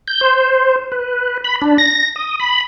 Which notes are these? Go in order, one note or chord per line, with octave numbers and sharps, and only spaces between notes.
G6
C5
B4
B5
D4
A#6
D#6
B5